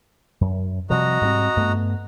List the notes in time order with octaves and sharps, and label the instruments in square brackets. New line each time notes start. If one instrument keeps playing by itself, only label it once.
[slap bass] F#2
[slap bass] C3 F3 G3 [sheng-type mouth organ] F#4 D#5 A#5
[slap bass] G#2 G3 C4
G2 A3 B3